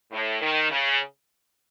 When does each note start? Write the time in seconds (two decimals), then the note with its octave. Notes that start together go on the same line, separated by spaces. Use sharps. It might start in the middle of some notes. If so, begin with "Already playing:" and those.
0.12 A2
0.41 D#3
0.71 C#3